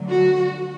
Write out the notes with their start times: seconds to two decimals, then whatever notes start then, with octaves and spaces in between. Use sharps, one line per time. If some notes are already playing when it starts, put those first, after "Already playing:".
Already playing: D2 D3 F#3
0.10 F#4